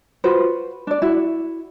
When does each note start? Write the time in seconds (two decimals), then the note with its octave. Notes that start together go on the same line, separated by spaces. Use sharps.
0.24 F4 F#4 B4 C5
0.87 D4 D5
1.02 E4 F#4